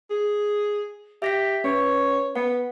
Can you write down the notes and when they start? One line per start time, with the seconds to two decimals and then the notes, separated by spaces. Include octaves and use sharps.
0.10 G#4
1.22 G4 E5 A#6 B6
1.64 C#4 B4 C#5
2.36 B3 F#5